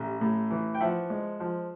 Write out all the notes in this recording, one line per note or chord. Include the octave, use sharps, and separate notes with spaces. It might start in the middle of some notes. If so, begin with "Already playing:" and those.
Already playing: A1 G3
A2
E3
G5
F3 E5 F#5
G#3
F3